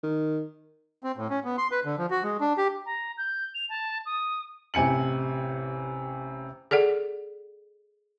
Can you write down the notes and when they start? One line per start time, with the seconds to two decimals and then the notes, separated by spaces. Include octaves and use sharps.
0.03 D#3
1.04 C4
1.17 A2
1.30 C#4
1.44 B3
1.58 C6
1.71 B4
1.85 D3
1.98 F3
2.11 F#4
2.23 G#3
2.41 D4
2.57 G4
2.86 A#5
3.18 G6
3.55 F7
3.69 A5
4.06 D#6
4.74 A1 C3 G#5 C#7 F#7
6.71 G#4 A4 D5 F#5